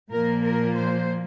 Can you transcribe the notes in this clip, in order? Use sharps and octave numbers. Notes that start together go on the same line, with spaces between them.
A#2 F3 A#3 A#4
A#4
C5